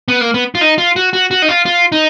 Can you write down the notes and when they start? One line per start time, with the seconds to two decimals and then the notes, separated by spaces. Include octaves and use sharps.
0.08 B3
0.21 A#3
0.34 B3
0.55 F4
0.61 D#4
0.78 F4
0.96 F#4
1.13 F#4
1.31 F#4
1.42 D#4
1.49 F4
1.66 F4
1.92 D#4